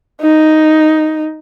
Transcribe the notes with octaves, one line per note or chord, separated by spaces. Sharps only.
D#4